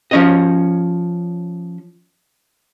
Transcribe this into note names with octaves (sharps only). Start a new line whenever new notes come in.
F3 C#4 D#5